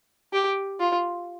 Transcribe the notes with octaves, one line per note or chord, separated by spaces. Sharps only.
G4
F4